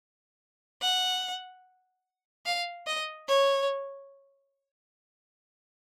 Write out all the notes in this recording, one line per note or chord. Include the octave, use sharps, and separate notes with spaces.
F#5
F5
D#5
C#5